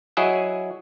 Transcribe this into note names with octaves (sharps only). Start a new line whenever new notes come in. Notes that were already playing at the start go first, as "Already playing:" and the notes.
F#3 E4 G#4 D#5 E5 F#5